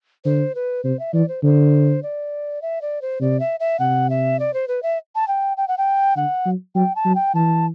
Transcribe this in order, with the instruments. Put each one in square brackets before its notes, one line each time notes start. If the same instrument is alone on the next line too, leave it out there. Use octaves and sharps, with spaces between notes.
[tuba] D3 [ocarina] C5
[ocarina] B4
[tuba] C3 [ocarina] C5
[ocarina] E5
[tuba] E3 [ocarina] D5
[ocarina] C5
[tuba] D3 [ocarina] C5
[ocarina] D5
E5
D5
C5
[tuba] C3 [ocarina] D5
[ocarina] E5
E5
[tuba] C3 [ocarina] F#5
[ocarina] E5
D5
C5
B4
E5
A5
G5
G5
F#5
G5
[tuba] D3 [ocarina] F#5
[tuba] F#3
[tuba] F#3 [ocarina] G5
[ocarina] A5
[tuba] F#3
[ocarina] G5
[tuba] E3 [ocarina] A5